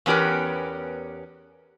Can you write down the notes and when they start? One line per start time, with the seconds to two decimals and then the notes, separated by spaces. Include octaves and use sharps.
0.06 E2 B3 C#4 G4 A#4 B4